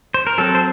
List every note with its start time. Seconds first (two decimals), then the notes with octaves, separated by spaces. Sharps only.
0.14 C5
0.27 A#4
0.38 F#3 C4 A4
0.55 C5